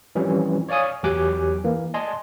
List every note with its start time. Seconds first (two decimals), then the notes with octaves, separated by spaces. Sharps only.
0.15 E3 F3 G3 C4 C#4
0.69 C#5 D5 F5 G#5 D#6
1.03 E2 F#3 G4 G#5 D6 F#6
1.64 E3 A#3
1.94 D5 D#5 G#5 A5 C6